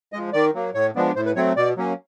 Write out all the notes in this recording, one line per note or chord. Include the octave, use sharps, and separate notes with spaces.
F3 G#3 D#5
D#3 D5
F#3 A#3
A2 C#5
F3 G#3 B3 D4
A2 C5
B4
F#3 A3 C4 C#5
B2 D5
F#3 A#3 C#4